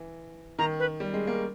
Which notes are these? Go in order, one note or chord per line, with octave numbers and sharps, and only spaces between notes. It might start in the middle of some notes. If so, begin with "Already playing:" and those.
Already playing: E3
D#3 A#5
B4
G3
G#3
A#3